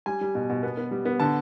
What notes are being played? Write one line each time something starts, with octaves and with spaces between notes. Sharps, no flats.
G3 G#5
G3
B2
B2
B3
B3
G3
B3
D3 A5